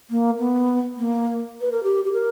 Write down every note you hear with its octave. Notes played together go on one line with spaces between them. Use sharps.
A#3
B3
A#3
B4
A#4
G4
G4
A#4